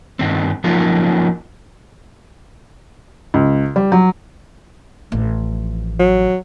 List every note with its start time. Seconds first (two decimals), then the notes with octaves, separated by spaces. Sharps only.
0.19 G2 D#3 C4
0.64 F3 F#3 A#3 C#4 D#4 F4
3.34 C#2
3.76 G3
3.92 F#3
5.12 A1 F3
5.99 F#3